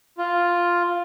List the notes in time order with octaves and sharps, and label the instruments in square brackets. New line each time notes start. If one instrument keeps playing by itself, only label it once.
[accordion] F4